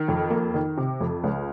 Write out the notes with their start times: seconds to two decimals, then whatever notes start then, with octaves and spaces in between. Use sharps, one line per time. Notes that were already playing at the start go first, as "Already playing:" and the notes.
Already playing: D#3
0.08 F2
0.30 A#3
0.54 D#3
0.78 C3
1.01 F2
1.24 C#2